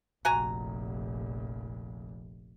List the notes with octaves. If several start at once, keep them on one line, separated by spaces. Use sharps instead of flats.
F1 A#1 F#4 G#5 A#5